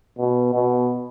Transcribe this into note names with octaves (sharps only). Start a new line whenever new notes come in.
B2
B2